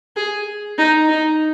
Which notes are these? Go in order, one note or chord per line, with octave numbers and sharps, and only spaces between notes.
G#4
D#4
D#4